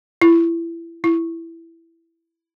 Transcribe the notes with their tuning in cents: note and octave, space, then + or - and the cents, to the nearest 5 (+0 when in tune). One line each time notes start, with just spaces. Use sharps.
E4 +25
E4 +10